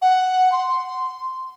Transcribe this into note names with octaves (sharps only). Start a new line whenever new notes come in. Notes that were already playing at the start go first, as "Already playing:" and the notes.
F#5
C6